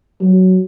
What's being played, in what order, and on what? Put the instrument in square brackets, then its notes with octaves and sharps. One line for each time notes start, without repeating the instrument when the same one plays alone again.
[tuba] F#3